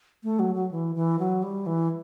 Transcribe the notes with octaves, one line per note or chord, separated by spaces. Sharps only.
A3
F#3
F#3
E3
E3
F#3
G3
E3